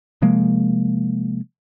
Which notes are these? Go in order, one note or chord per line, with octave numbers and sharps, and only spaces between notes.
C3 F3 G#3 A#3